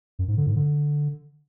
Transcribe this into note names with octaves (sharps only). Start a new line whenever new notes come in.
F#2
G#2
D3
G#2
D3